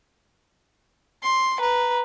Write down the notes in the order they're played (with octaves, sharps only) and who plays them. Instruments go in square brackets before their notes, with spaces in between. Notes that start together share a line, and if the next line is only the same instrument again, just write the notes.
[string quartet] C6
[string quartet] B4 [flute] A#5